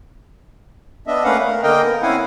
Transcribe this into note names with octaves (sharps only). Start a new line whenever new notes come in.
B3 D4 D#5 E5
A3 A#3 C#4 B4 F5 F#5
A#4
D3 A#3 A#4 D#5 G5
B3
C4 C#4 E4 F5 F#5 G#5